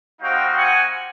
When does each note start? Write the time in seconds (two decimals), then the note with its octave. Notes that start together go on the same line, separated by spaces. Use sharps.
0.20 G3 C4 D#4 F#4 F5 G5
0.56 F#5 G#5